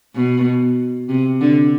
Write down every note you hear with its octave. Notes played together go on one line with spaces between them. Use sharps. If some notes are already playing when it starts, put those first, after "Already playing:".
B2
C3
D3